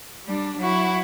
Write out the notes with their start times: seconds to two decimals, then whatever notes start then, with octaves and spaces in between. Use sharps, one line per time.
0.25 G3 D4
0.58 F#3 E4 F#4